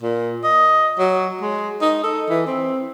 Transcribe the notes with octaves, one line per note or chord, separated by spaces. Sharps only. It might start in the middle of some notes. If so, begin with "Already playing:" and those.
A#2
D#5
F#3
G#3
D#4
A4
E3
C4